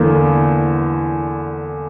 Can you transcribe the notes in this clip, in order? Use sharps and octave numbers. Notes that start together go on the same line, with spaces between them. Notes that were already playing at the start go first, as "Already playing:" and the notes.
Already playing: E2 D3 A#3